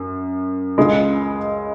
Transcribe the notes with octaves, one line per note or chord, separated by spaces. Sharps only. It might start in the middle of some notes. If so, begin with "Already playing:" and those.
Already playing: F#2
C#2 C#3 G#3